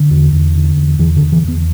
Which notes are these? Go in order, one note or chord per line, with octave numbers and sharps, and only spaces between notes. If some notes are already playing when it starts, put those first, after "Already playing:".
Already playing: D3
E2
E2
D3
E2
E2 E3
D3
E2
E3
E2 B3